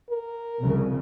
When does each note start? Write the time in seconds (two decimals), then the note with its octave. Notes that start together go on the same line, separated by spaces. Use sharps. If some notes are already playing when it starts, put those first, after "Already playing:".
0.11 A#4
0.61 C2 F2 C#3